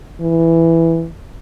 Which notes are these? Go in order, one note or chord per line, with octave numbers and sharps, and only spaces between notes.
E3